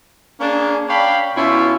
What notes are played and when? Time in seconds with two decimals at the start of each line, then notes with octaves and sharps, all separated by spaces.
0.41 A#3 C#4 D4 G#4
0.89 D4 C#5 F5 G5 B5
1.36 B2 C#4 E4 F4 E5